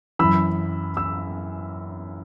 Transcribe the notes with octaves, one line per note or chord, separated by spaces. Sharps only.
F#2 E3 B5 E6
E6